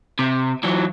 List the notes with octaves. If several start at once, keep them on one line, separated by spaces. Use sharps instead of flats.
C3
E3 F#3